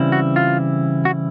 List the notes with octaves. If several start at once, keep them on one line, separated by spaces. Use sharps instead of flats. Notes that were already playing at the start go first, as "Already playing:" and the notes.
Already playing: C#3 E3 G3 C4 E4
F#4
F4
F#4